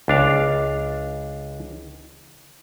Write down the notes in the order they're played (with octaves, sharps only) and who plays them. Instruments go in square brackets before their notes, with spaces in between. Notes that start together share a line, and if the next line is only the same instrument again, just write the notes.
[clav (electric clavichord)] C#2 D4 F5